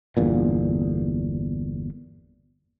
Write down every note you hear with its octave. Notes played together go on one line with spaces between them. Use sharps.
G1 E2 A#2